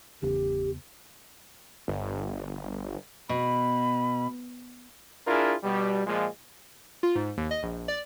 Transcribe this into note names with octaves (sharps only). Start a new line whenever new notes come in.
G1 E2 C#3 B3 G4
G1
B2 B5
D4 E4 F4 G#4 A#4
B2 G3
A#2 F3 G#3
F4
G#2
D#2
D#5
A#1
D5